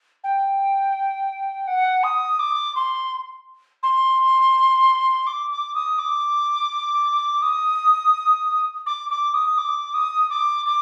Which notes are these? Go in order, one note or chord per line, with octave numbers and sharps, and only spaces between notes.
G5
F#5
D#6
D6
C6
C6
D6
D6
D#6
D6
D#6
D6
D6
D#6
D6
D#6
D6
D6